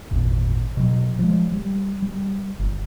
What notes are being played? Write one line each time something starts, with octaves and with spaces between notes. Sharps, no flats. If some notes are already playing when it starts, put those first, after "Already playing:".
G#1 E2 A#2
B2 F#3
F3 G#3
G3
G3
G1